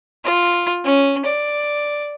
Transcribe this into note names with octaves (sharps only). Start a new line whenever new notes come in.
F4
C#4
D5